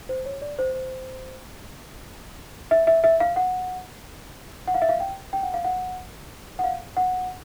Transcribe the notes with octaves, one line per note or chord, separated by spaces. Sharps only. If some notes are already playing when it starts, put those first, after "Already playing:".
C5
C#5
D5
C5
C5
E5
E5
E5
F5
F#5
F#5
F5
E5
F5
G5
G5
F#5
F5
F#5
F#5
F5
F#5